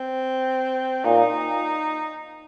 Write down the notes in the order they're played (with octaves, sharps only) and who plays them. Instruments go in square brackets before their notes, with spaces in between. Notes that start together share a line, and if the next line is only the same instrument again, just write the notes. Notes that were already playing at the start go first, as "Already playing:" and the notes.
Already playing: [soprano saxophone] C4
[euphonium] A#2 [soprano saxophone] D#4